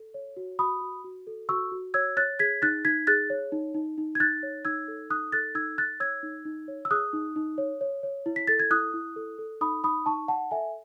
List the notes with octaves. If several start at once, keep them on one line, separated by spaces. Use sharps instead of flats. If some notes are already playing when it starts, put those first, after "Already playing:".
Already playing: A4
C#5
F#4
F#4 B5 D#6
F#4
F#4
A4
F#4 C#6 E6
F#4
C#5 E6 G#6
C#5 F#6 A6
G#4 G#6 B6
D#4 F#6 A6
D#4 G#6 B6
G#4 F#6 A6
C#5
D#4
D#4
D#4
G#6
D#4 F#6 A6
C#5
D#4 E6 G#6
A4
D#4 D#6 F#6
A4 F#6 A6
D#4 E6 G#6
D#4 F#6 A6
C#5 E6 G#6
D#4
D#4
C#5
E6
G#4 D#6 F#6
D#4
D#4
C#5
C#5
C#5
E4
B6
A4 A6
G#6
E4 D#6 F#6
E4
A4
A4
D#4 B5 D#6
D#4 B5 D#6
D#4 A5 C#6
D#4 F#5 A5
A4 E5 G#5